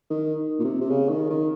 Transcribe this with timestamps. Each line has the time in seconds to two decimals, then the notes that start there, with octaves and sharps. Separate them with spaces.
0.10 D#3
0.59 A#2
0.64 C3
0.81 C3
0.90 C#3
1.09 D#3
1.30 D#3